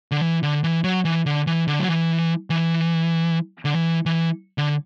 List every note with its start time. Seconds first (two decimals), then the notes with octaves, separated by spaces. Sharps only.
0.11 D3
0.22 E3
0.43 D3
0.64 E3
0.84 F#3
1.05 E3
1.26 D3
1.47 E3
1.68 D3
1.79 F#3
1.88 E3
2.50 E3
3.65 D3
3.75 E3
4.06 E3
4.58 D3